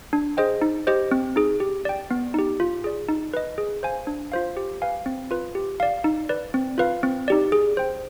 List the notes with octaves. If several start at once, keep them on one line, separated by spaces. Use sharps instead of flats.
D4
G#4 C5 D#5 G5
D#4
G4 C5 D#5
C4
D#4 G#4
G4
D5 G5
B3
D#4 G4
F4
G#4 D5
D#4
B4 D#5
G#4
C5 F5 G#5
D4
F4 C5 F5
G4
B4 F5 G#5
C4
F4 B4
G4
D5 F5
D#4
B4 D5
C4
F4 B4 F5
C4
D#4 G4 D5
G#4
C5 G5